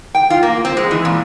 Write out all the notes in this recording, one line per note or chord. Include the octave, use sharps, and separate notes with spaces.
G5
F4
A#3
C4
G#3
E3
A#2